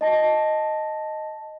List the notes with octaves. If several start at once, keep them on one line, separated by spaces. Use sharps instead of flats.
D#5 A5 A#6